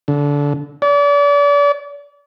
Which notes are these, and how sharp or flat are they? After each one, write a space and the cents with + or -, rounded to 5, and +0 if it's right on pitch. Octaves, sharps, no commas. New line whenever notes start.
D3 -25
D5 -40